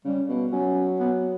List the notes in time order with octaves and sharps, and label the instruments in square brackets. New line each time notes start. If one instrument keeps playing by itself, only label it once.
[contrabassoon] C#3 [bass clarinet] G3
[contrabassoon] B2
[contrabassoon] F#3 [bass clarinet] C#4
[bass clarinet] B3